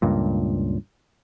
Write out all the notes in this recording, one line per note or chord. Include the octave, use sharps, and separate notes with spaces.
C#2 G2 A#2